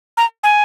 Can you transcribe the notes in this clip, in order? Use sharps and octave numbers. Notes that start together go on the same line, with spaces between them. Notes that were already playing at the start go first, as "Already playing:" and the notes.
A#5
G#5